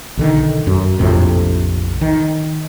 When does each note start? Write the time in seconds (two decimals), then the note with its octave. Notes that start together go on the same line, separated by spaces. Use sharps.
0.17 B1 D3 D#3
0.67 F#2
0.99 A#1 F2 A2 C3
2.01 D#3